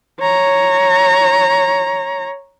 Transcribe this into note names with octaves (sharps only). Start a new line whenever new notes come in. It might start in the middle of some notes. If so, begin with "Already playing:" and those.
C#5 A#5